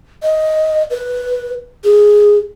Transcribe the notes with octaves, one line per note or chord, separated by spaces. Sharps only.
D#5
B4
G#4